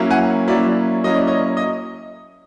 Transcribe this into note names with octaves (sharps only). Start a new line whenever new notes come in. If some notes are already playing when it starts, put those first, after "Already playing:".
Already playing: F#3 A#3 C#4 E4
F#5 G#5
F#3 A#3 C#4 E4 D5 E5
F#3 A#3 C#4 E4 D#5
D5
C#5 D#5
D#5